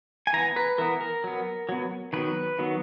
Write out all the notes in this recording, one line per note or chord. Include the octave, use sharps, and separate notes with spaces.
G#5
E3 B3 A#5
B4
E3 B3 A#4
A#4
F#3 B3
F#3 B3
D#3 F#3 B3 B4
D#3 F#3 B3